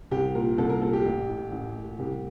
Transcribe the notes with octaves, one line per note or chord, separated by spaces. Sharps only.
C2 G4
A#2 A#4
C2 A4
A#4
A#2 A4
G4
A1
A2
A1
A2
C2 G4